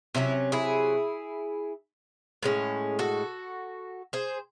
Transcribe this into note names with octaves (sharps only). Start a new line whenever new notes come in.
C3 F#3 C#4 E4
E4 G#4
A2 G#3 C#4
F#4 A4
G#4 C5